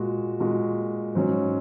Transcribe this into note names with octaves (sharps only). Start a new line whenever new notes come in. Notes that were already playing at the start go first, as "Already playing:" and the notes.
Already playing: A#2 G#3 F#4
A#2 G#3 F#4
G#2 F#3 C#4